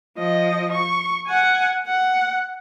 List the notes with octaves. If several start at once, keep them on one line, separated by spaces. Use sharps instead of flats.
F3 D#5
C#6
F#5 G#5
F#5